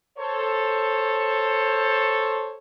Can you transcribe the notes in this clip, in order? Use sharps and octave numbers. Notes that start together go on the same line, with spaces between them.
A4 C5 C#5